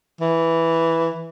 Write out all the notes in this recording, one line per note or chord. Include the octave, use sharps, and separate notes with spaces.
E3